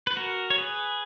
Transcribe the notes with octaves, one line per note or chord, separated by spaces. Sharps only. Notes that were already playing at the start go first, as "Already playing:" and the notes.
B4
F#4 A#4
C#5
G#4 B4